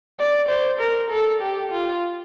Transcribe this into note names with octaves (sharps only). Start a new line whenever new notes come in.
D5
C5
A#4
A4
G4
F4